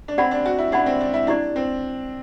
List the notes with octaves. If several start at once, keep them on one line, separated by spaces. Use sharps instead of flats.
D4
C4 G4 D5 F#5 B5
D4
F#4
E4
D4 G4 D5 F#5 B5
C4
D4
E4
D4 E4 G4 D5
C4